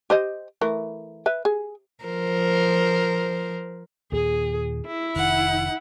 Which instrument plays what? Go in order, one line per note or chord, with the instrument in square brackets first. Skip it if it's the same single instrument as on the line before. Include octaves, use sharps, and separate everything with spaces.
[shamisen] G4 C5 D#5
E3 A3 A#4
B4 E5
G#4
[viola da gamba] F3 A#4 C5
[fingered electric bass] D#2 A#2 [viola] G#4
[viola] E4
[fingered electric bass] F1 D#3 [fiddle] F#5